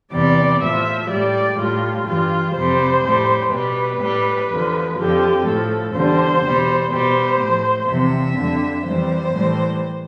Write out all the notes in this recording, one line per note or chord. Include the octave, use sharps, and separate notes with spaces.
E2 C3 G3 D5
A2 F3 E5
A2 G3 D5
A2 G3 F4
G2 E3 G3 F4
F2 C3 G3 C5
A2 G3
B2 G3 B4
A2 G3
E2 D3 F3
F2 D3 F3 G4
A2 F3 A4
E2 D3 G3 C5
E2 B2 G3
B2 G3 C5
A2 F3
E2 C3 F3 E5
F2 D3 G3
F2 E3 G3 C5
A2 E3 G3